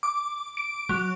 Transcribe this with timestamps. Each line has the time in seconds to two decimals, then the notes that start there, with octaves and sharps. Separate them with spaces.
0.03 D6
0.57 D7
0.89 F#3